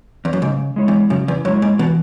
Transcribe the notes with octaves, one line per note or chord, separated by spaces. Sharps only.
E2
F#2
G#2 C#3
G#3 E4 C#5
E2
F#2 C#3
E2
F#2 G#3 E4 C#5
G#2
B2 E3